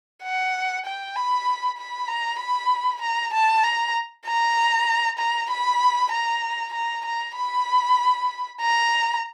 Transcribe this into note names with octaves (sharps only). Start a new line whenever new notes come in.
F#5
G5
B5
B5
A#5
B5
A#5
A5
A#5
A#5
A#5
B5
A#5
A#5
A#5
B5
A#5